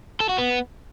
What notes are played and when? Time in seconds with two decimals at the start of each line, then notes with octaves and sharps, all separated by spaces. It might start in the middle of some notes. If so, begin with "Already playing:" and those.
0.20 A4
0.29 F#4
0.38 B3